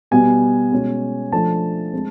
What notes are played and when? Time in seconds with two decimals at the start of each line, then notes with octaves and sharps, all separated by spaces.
0.11 B2 G3 B3 G#5
0.72 B2 G#3 C#4
1.32 F3 A3 D4 A5
1.93 G#3 C4